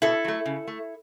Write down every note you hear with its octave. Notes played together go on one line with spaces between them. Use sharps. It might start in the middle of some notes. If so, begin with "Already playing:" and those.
B2 E4 A4
F#3 A3
C#3
A3